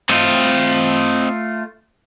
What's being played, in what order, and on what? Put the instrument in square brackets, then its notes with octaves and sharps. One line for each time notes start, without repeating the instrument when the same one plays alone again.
[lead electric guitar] A3 F4 [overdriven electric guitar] C4 D#5